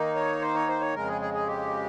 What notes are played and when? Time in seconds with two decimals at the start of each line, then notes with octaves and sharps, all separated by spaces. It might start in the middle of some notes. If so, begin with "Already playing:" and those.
Already playing: D#3 A#3 D#4
0.15 C#5
0.42 C5
0.55 C#5
0.68 C5
0.81 C#5
0.94 F2 C#3 G#3 A#4
1.08 G#4
1.21 G#4
1.34 G#4
1.47 G4